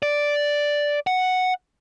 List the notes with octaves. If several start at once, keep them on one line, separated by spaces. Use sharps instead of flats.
D5
F#5